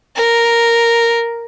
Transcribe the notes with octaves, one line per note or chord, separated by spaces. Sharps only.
A#4